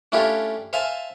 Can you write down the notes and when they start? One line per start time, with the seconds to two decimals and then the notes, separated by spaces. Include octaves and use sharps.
0.12 A3 C#4 D4 E4 F4 G4
0.73 C5 E5 F5 G#5 A5